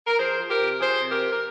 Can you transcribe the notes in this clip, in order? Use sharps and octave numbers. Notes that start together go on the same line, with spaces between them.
A#4
F3 G#4 C5
F3
G4 A#4
C3
F3 G#4 C5
C3
G4 A#4
F3
A#4